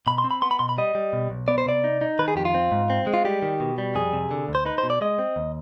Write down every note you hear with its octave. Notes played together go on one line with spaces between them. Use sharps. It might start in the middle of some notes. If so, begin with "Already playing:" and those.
B2 B5
C6
C4
B5
B3 C6
B5
B2 C6
B5
G3 D#5
G3
B2
B1
B3 D5
C5
C3 D5
D#4
D#4
D#3 B4
G#4
F2 G4
F4
C4
G#2
C4
G#3
F4
G3 G4
D#3
B2
G3
F2 G#4
C3
D3
D2
C5
D#4 B4
C5
B2
D5
G#3 D#5
C4
D#2